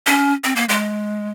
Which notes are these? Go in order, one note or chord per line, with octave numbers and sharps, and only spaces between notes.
C#4
C4
A#3
G#3